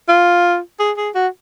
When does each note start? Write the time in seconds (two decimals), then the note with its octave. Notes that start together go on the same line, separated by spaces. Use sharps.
0.09 F4
0.79 G#4
0.97 G#4
1.15 F#4